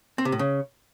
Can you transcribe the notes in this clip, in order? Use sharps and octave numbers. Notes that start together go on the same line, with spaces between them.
C4
C3
A2
C#3